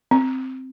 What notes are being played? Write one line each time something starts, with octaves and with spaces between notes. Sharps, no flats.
C4